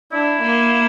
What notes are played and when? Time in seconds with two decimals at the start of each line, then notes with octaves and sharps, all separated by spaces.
0.12 D4 E4
0.41 A#3